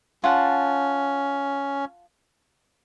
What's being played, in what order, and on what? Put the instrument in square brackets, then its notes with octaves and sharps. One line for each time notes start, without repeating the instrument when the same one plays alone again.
[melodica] C#4 [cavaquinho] F4 F#5 A5